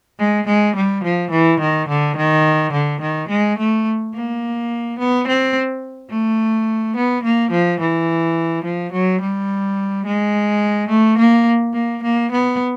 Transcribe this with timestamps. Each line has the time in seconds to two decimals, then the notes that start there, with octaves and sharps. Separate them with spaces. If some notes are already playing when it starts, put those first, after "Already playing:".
0.18 G#3
0.46 G#3
0.74 G3
1.03 F3
1.30 E3
1.59 D#3
1.87 D3
2.15 D#3
2.71 D3
3.00 D#3
3.28 G#3
3.56 A3
4.12 A#3
4.97 B3
5.25 C4
6.09 A3
6.94 B3
7.22 A#3
7.50 F3
7.79 E3
8.63 F3
8.92 F#3
9.19 G3
10.04 G#3
10.88 A3
11.16 A#3
11.73 A#3
12.02 A#3
12.29 B3